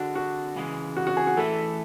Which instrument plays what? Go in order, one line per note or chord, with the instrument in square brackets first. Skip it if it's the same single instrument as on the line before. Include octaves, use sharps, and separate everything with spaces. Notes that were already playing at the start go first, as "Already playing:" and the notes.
Already playing: [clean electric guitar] D3 G#3 D4 [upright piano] F#4
[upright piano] F#4
[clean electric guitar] C#3 E3 G#3
[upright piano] F#4
F#4
G#4
F#4
[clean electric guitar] E3 A3 E4 B4 [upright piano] A4